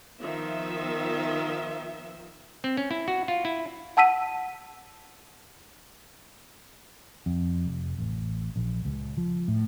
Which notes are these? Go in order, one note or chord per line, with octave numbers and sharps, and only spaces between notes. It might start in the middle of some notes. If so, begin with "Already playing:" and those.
D#3 F3 B3 E5
C4
C#4
E4
F#4
F4
E4
F#5 A5 E6 B6 D#7
F2
F1
A1
A#1
C#2
F3
A2